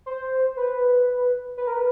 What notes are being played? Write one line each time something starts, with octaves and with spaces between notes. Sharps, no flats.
C5
B4
B4
A#4
B4